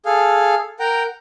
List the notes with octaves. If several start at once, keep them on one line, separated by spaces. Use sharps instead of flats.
G#4 A4 F5
A#4 F#5 G5 A#5